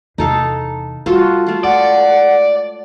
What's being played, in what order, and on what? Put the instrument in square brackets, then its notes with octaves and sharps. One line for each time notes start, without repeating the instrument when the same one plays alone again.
[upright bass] E2 C3 [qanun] D#4 A4 F5
[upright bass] G3 [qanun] F4 F#4 A4
[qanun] A3 F4
[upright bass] G#3 [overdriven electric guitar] D5 [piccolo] F#5